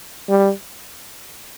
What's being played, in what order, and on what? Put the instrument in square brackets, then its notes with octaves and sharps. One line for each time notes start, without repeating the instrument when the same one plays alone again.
[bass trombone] G3